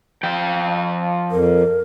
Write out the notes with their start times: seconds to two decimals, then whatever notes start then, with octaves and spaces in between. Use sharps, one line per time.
0.23 F3 G5
1.31 F2 A#4